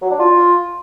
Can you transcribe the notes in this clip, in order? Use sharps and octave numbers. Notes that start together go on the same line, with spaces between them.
F#3
D4
F4